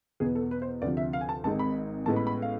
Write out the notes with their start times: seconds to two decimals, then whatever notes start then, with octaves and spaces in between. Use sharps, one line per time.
0.20 E2 B2 B3 G#4
0.35 A4
0.51 B4
0.62 C5
0.82 D2 C3 F3 D5
0.97 E5
1.13 F5
1.21 G#5
1.29 A5
1.44 G#1 G#2 G#3 C4 A5
1.59 B5
2.06 A1 A2 G#3 B3 A5
2.16 B5
2.27 B5
2.42 F5